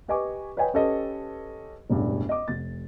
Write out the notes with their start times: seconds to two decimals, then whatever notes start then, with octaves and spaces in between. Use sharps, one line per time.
0.08 G4 B4 D#5 G#5 C#6 D6
0.57 B4 C#5 D#5 G5 G#5
0.74 C#4 G4 A4 B4 D#5
1.90 E1 A1 G2
2.29 D#5 D6
2.48 F1 A6